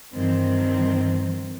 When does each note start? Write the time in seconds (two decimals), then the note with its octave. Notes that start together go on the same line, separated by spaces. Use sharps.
0.15 G2 D#3 E3 C4